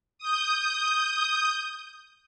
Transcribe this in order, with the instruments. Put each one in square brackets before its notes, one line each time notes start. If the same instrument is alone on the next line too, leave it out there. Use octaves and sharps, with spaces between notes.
[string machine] D#6 G6